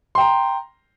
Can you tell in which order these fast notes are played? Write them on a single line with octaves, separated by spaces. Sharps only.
C6 G5 A#5